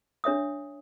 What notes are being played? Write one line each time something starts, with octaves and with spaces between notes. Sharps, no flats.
D4 C#5 E5 D#6